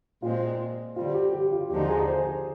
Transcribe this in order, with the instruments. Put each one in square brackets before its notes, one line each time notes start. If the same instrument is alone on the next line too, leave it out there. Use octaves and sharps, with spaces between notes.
[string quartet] A#2 G#3 C4 [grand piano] F4
[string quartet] D3 G3 C4 [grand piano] F4
[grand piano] G4
G4
F4
[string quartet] D#2 D3 F3 G#3 D#4 [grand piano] G4
[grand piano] G#4
C5